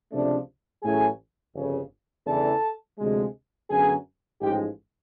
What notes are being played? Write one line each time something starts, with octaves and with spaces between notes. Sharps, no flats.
C#2 C3 F3 A3 D4
A1 A2 F#3 A3 C#4 G#4 G#5
G1 F2 C#3
E2 C#3 E3 A3 D4 A4 A5
D2 C3 F3 G#3
F#2 D3 F#3 B3 G#4 G#5
A1 G#2 F3 G#3 G4 G5